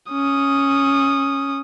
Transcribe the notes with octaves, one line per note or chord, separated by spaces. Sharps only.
C#4 D#6